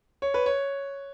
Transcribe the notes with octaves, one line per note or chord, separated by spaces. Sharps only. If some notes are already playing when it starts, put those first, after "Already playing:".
C#5
B4
C#5